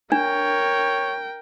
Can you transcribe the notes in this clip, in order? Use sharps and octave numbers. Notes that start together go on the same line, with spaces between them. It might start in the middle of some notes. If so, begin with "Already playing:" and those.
D4 A#4 C#5 G5